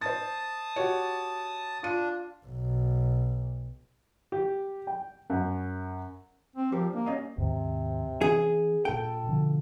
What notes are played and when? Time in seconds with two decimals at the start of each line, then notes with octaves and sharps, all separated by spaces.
0.01 C5 A5 D#6 A6
0.76 F#4 G4 C#5
1.83 D4 F4 D#7
2.46 B1
4.32 G4
4.87 G5
5.30 F#2
6.56 C4
6.72 F3 G4 A#4
6.93 A#3 D4
7.06 C#4 D#5 F5
7.38 D#2 G#2 C3 D#3
8.21 E3 C#4 G#4
8.85 A#2 D4 A4 G5
9.27 B2 D3 F3